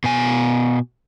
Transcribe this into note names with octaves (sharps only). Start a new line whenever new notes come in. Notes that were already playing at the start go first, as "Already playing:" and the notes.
B2 G#5